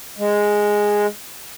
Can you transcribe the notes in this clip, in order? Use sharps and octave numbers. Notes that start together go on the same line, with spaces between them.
G#3